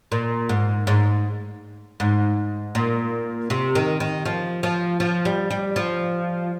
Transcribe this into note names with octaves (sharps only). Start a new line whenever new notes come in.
A#2
G#2
G#2
G#2
A#2
C3
D#3
D#3
F3
F3
F3
G3
G3
F3